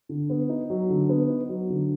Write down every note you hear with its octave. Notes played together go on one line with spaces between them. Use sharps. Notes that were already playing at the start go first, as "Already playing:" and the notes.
D3
B3
D#4
F#3
D3
B3
D#4
F#3
D3